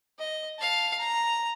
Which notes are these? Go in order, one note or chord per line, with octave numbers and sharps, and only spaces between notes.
D#5
F5 A5
A#5